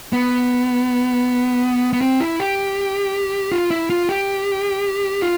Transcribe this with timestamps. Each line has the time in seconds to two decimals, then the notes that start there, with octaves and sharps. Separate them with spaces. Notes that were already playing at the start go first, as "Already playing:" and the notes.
0.13 B3
1.93 B3
2.01 C4
2.20 E4
2.39 G4
3.52 F4
3.71 E4
3.90 F4
4.09 G4
5.22 F4